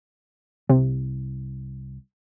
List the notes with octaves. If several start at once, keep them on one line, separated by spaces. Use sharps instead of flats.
C2 C3